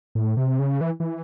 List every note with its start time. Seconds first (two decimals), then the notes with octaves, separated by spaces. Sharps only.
0.15 A2
0.37 C3
0.59 C#3
0.81 E3
1.00 E3